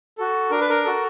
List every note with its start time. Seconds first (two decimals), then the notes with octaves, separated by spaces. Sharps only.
0.18 F#4 A4
0.51 D4 A#4
0.60 B4
0.70 A#4
0.84 F#4 A4